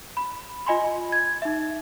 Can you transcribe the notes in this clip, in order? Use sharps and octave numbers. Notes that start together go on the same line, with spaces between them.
B5
F4 D#5 G#5 B5 C6
G#6
D#4 E5